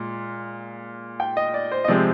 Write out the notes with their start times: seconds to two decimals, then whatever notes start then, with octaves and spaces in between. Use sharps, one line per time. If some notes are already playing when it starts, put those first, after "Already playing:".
Already playing: A#2 G#3
1.20 G5
1.37 D#5
1.54 D5
1.72 C5
1.85 D#5
1.88 C3 F3 G#3 C4 D5